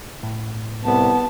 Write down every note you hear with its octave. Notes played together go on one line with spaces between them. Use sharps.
A2
C2 B3 A5